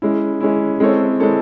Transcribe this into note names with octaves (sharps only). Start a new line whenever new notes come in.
G#3 C#4 E4
G#3 C#4 E4
G#3 C4 E4 A4 C#5
G#3 C4 E4 A4 C#5